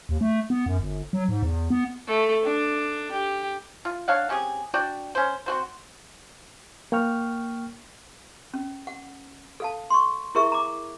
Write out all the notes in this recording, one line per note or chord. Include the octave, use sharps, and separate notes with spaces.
D#2
A3
B3
F#2
G1
F#3
G#2
E2
B3
A3
D4
G4
F4
D4 C#5 F5 F#5
C4 C#4 G4 G#4
D4 F#4 D5 G5
C#4 C5
C4 F#4 C5
A#3 G5 C#6 F6
C#4
F#5
A4 F5 A5
C6 C#6
E4 G#4 A#4 E5 C#6
A#5 D6